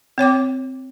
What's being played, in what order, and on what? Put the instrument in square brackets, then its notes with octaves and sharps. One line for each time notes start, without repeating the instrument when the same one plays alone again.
[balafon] C4 C#5 G5 D6